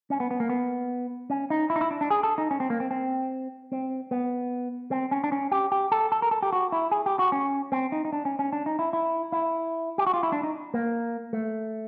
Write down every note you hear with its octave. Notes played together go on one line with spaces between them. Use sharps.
C#4
B3
B3
A#3
B3
C#4
D#4
E4
D#4
E4
D4
D4
G#4
A4
D#4
C#4
C4
A#3
C4
C4
C4
B3
C4
C#4
D4
C#4
G4
G4
A4
A4
A#4
A4
G4
F#4
E4
G#4
G4
F#4
C#4
C4
D#4
D#4
D4
C#4
C#4
D4
D#4
E4
E4
E4
G4
F#4
F4
E4
D4
D#4
A#3
A3